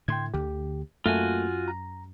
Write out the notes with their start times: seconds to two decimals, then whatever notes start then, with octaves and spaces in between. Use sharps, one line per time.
0.08 A2 D3 A3 G5 C6 G#6
0.34 D2 D3 G4
1.06 F#2 A3 A#3 F4 F#4 G#5
1.68 A#5